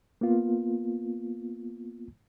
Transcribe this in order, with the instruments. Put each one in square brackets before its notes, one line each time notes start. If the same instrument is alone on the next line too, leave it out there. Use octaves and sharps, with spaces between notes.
[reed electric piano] A#3 B3 F4